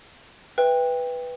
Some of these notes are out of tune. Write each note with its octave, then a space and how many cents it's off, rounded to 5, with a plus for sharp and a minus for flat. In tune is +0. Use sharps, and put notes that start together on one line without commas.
B4 +0 E5 +0 G5 +20